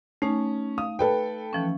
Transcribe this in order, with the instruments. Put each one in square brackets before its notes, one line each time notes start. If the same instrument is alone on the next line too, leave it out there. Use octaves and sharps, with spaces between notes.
[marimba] A3 D#4 [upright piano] C#4
[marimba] F5 [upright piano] D#6
[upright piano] A4 B4 G5
[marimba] E3 F3 C#4